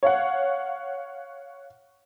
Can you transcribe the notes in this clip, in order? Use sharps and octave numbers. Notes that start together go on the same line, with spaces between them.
C#5 F5 F#5